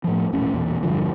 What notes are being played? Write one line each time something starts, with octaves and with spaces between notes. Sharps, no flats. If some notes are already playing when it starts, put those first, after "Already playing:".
A2 F3
E1 A#1 A2 C#4
B1 E2 A#2
E1 G2 D3 F3